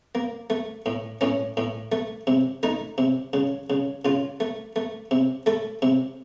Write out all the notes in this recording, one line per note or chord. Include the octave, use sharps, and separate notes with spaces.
A#3
A3
A2
A2 C#4
A2
A3
C3
A3 D#4
C3
C#3
C#3
C#3 F4
A3
A3
C3
A3 A4
C3